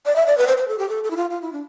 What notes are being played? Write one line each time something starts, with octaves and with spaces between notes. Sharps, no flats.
D5
E5
D5
B4
C5
C5
A4
G4
A4
A4
E4
F4
F4
E4
D4